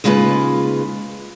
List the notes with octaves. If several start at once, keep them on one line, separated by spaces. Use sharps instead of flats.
D#2 C#3 G#3 F4 F#4 B4